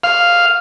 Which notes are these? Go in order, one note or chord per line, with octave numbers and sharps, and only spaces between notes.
F5